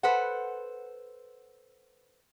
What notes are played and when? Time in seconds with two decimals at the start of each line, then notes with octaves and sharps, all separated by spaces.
0.03 A4 B4 C5 F#5